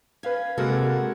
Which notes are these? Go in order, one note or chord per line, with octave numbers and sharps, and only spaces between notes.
C#4 B4 F5 G#6
C3 G#3 A#3 F#4 A4 F6 F#6